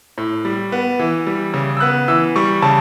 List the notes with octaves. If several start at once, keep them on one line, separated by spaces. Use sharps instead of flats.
A2
G3
B3
E3
G3
C#3
E6
B3 F#6
E3 E6
G3 C#6
C#3 A5